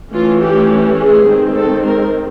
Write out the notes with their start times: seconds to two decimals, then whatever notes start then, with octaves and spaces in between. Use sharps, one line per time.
0.13 E3 A3 C#4 F4
0.43 G4
0.99 G#4
1.29 D#3 G#3 C4
1.57 A4
1.86 A#4